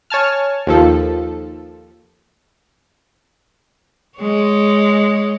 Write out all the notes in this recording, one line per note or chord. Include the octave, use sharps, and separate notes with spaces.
C#5 G#5 A5 F6
D#2 F3 A4
G#3 C#5